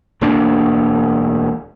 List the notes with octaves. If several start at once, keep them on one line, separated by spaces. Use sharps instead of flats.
E1 D2 A#3 D4